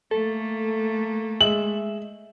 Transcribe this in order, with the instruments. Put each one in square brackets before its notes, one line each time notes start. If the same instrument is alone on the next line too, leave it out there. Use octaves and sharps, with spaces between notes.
[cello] A3 A#3 [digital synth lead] A4
[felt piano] G#3 [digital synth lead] E5 [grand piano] F#7